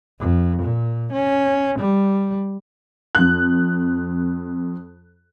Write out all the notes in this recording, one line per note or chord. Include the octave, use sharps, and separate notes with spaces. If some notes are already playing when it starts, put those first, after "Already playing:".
F2
A#2
C#4
G3
F2 F#6